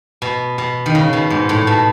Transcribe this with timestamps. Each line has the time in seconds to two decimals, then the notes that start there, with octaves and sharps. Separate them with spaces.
0.22 B2
0.58 B2
0.86 D#3
0.95 C#3
1.13 B2
1.30 G#2
1.49 A2
1.67 B2